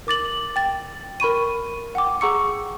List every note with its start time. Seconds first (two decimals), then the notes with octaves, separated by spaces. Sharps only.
0.07 A#4 D6 A6 F#7
0.56 G5 A6
1.20 A#4 B5 C#6 D#7
1.95 F#5 G5 D6
2.21 G#4 F#5 A#5 C#6 E6 C#7